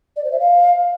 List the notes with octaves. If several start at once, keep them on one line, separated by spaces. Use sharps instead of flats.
D5
C5
E5
F5